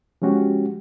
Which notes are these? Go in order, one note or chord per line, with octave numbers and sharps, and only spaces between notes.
F3 G#3 C#4 F#4 G4